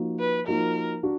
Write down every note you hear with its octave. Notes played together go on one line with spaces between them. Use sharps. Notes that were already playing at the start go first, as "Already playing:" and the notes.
Already playing: F3 A#3 D#4 F#4
B4
F3 A#3 D#4 F#4 A#4
D4 F#4